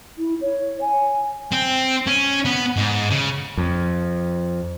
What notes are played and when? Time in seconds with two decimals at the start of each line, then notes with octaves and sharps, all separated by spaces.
0.19 E4
0.41 C#5
0.81 G#5
1.52 C4
2.07 C#4
2.45 B3
2.77 G#2
3.11 C#3
3.57 F2